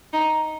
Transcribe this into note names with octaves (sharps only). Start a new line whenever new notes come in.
D#4